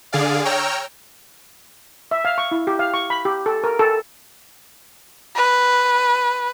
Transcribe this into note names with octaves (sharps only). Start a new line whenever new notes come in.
D3 G#4 D5 F5
C#5 G5 A#5 E6 F6
E5
F5
C#6
E4
G4
F5
C#6
B5
G4
A4
A#4
A4
B4